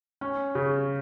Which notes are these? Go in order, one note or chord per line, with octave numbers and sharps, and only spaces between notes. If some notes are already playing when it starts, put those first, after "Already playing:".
C#4
C#3